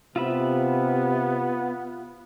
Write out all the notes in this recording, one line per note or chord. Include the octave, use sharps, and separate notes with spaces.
C3 B3 F4 E5 B5